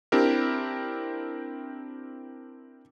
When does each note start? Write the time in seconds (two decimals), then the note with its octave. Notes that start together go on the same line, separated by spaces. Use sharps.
0.12 C4 D4 E4 G4 A#4